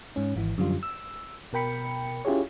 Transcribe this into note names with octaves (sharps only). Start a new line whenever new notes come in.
G#2 C#4
G#1 E3
F#2 D3 F3 G3 F4
E6
B2 A#4 G5 B5 C#7
C#4 E4 F4 G4 G#4 C#5